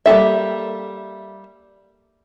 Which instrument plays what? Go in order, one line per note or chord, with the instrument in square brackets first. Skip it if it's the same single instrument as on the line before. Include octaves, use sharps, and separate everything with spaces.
[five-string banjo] G3 A#3 A4 E5